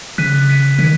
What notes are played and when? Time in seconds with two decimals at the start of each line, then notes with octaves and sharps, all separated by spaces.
0.18 C#3 F#6 B6 D#7
0.48 F#6 B6 D#7
0.78 D#3 F#6 B6 D#7